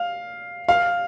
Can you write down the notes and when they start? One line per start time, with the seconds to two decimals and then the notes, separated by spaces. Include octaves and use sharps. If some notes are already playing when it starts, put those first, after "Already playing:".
Already playing: F5
0.68 F5